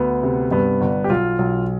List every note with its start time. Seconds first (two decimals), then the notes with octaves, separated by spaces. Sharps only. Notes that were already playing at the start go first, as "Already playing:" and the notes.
Already playing: D2 B3
0.23 C3
0.51 G2 B3
0.81 G1
1.04 G4
1.10 B1 F4
1.39 B1